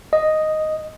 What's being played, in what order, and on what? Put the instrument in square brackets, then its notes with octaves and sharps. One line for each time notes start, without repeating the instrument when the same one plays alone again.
[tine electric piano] D#5